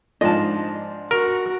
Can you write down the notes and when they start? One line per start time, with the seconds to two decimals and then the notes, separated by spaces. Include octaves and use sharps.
0.21 G#2 F3 D4 D#5 A5
1.11 F#4 A#4